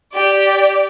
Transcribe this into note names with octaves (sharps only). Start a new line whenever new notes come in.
G4 D5